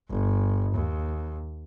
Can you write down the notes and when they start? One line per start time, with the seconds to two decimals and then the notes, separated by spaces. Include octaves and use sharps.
0.10 G1
0.73 D#2